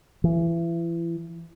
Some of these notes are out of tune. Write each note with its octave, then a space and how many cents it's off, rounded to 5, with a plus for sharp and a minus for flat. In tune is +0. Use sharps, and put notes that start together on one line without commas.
E3 +30